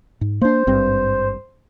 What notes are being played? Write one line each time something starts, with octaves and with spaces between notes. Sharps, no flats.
G#2
A#3 D4 C5
G#1 G2 C4